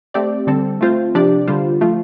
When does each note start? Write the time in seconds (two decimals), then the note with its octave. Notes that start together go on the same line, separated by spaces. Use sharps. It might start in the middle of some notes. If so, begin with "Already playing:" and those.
0.14 A3 C4 G4 D5
0.47 D3 G3 C4 A4
0.81 A3 C4 F4 C5
1.15 C3 F3 D4 G4 D5
1.48 D3 G3 F4 C5
1.81 F3 A3 F4